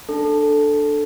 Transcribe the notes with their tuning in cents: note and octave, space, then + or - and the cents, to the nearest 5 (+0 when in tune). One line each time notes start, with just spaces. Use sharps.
D4 +10 A4 +0